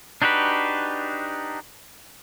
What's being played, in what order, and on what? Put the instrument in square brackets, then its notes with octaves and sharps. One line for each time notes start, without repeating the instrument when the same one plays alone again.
[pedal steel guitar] D4 D#4 F#4 G4 B4